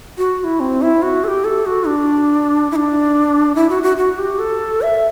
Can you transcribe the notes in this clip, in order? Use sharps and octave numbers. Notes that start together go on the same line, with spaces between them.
F#4
F#4
E4
C4
E4
F#4
A4
G4
A4
F#4
D4
E4
D4
E4
F#4
F#4
F#4
G4
A4
E5